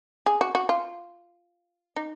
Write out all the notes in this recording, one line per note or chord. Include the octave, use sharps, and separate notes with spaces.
G#4
F#4
F#4
F4
D#4